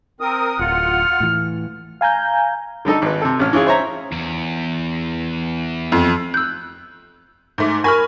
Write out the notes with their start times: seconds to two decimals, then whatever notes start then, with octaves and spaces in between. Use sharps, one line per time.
0.20 C4 A#4 D#6
0.59 D1 F4 F#5 F6
1.20 A2 E3
2.01 F5 G#5 A#5 G6
2.85 D3 G3 D#4 A4
3.02 G#1 B4
3.22 C3 A4
3.39 A1 C#4 F6
3.53 E3 C#4 F4 G#4
3.67 C5 C#5 E5 A#5
4.12 E2
5.92 F2
6.34 E6 F#6 G6
7.58 G#2 A3 D6
7.84 A#4 G#5 B5 C#6 F6 A#6